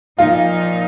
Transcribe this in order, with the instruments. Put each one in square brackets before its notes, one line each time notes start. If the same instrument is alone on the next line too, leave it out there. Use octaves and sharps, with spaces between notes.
[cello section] A#2 F3 D#4 [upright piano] F4